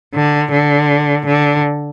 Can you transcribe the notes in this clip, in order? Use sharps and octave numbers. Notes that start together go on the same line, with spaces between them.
D3
D3
D3